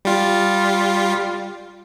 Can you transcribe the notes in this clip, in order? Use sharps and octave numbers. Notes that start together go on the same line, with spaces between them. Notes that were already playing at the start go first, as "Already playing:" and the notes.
G3 F4